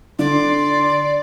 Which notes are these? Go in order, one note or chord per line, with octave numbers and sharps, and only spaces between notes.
D3 D5 C6